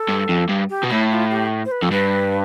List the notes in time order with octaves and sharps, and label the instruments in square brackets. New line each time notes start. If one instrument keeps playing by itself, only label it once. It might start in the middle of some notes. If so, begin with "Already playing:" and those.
Already playing: [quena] A4
[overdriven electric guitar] G2
F2
G2
[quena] G4
[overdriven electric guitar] B2
[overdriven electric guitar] A2 [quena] E4
[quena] F4
G4
C5
B4
[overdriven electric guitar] F2 [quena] A4
[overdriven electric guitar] G2 [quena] B4